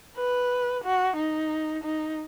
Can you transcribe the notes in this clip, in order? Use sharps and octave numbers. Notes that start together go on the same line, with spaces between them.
B4
F#4
D#4
D#4